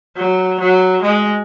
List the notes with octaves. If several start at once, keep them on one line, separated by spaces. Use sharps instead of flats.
F#3
F#3
G#3